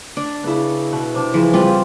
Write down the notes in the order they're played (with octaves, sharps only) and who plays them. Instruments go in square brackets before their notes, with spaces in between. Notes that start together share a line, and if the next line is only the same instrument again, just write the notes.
[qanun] D4
[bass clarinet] C#3 [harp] B3 E4
[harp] B2
C3 D4
[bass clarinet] C#3 [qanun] E3 [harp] F3
[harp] G3 [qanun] C4 F4 B4